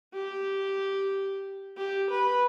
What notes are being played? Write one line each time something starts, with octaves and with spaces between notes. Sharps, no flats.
G4
G4
B4